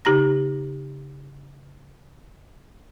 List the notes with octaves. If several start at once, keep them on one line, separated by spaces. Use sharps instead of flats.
C#3 D#4 G4 A#5 A#6